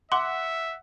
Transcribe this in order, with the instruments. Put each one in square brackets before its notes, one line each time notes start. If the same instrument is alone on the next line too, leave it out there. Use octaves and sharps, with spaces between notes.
[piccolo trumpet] E5 [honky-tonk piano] F#5 [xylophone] C6 D6